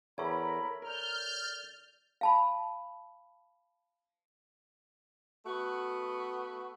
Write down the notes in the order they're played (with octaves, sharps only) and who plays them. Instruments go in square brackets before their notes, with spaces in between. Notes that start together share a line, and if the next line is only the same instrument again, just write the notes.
[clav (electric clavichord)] E2 [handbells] A4 C#5 [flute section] A#4 A#5 B5
[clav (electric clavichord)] A#4 [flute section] D5 [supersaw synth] F6 G6
[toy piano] F5 A5 B5
[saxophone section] A3 B3 F#4